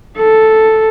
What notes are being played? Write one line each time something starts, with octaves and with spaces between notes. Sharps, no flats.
A4